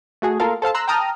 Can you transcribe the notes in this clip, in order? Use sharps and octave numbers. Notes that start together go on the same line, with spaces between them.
A3 F#4 G#4
A#3 F4 A4 A#4 F5
A4 C5 F5 A5
A#5 C6 E6 F#6
G5 A5 A#5 D#6 F6